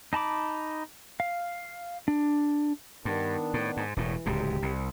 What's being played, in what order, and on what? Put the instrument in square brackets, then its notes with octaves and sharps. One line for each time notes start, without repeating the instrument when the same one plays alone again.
[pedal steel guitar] D#4 A5 B5 D6
F5
D4
[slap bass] G2 [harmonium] D#3 B3 D4
[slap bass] A2
G#2
[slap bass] E1 A2 [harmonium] E3
[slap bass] D1 C#2 G#2 [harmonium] G4
[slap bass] C2